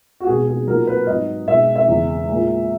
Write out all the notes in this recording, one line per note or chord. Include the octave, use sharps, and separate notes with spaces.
F#4
B2 G#3 G#4
G#4
A#2 F#3 A#4
B4
G#2 F#3 D#5
B2 G#3 E5
E5
E2 C#3 G#3
A#2 G#3